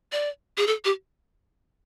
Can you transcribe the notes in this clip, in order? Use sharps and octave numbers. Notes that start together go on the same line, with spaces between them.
D5
G#4
A4
G4